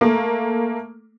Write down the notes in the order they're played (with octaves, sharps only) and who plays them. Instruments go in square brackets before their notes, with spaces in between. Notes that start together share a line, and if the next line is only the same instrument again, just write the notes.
[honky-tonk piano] A3 A#3